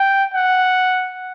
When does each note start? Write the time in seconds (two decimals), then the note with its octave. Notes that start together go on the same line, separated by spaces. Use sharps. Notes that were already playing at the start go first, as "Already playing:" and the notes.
Already playing: G5
0.34 F#5